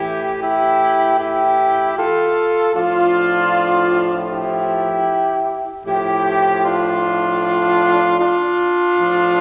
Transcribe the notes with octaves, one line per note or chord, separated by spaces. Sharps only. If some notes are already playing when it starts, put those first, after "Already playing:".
Already playing: A2 E3 E4 G4
E4 G4
E4 G4
F4 A4
A2 F3 D4 F4
E4 G4
A2 F3 E4 G4
D4 F4
D4 F4
A2 F3